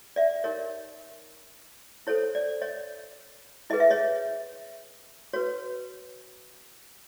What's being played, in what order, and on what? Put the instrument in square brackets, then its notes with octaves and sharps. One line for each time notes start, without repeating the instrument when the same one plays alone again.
[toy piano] D5 E5
D#4 G4 A#4 C#5 D#5
E4 A4 C5 C#5
D5
C#5 D#5
E4 G#4 B4 D#5
E5
C#5 D#5
F#4 B4 C#5